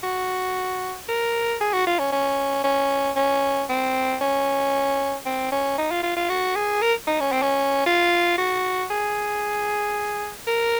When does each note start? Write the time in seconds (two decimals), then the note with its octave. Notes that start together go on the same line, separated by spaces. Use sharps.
0.03 F#4
1.09 A#4
1.61 G#4
1.73 F#4
1.87 F4
1.99 C#4
2.12 C#4
2.64 C#4
3.16 C#4
3.69 C4
4.21 C#4
5.26 C4
5.52 C#4
5.78 D#4
5.91 F4
6.03 F4
6.17 F4
6.29 F#4
6.56 G#4
6.82 A#4
7.07 D#4
7.20 C#4
7.32 C4
7.42 C#4
7.87 F4
8.38 F#4
8.91 G#4
10.47 A#4